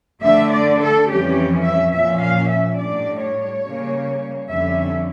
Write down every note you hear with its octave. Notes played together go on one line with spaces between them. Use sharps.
D3 A3 D4 E5
D5
A4
F2 E3 G3 C#4 G4
E5
A#2 F3 C#4 E5
F5
E5
A2 G3 D4 D5
C#5
C#3 G3 A#3
F2 D3 G3 C#4 E5